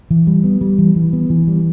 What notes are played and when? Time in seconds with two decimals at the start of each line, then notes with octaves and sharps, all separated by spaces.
0.11 E3
0.27 G3
0.44 B3
0.61 G3
0.78 E3
0.96 E3
1.13 B3
1.30 E3
1.48 G3